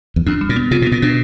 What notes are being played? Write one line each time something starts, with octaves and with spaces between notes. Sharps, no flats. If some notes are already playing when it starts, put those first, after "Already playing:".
E2
F2 D4
G3
A#2
B3
C3 F4
B2
A#2 B3
B2 D4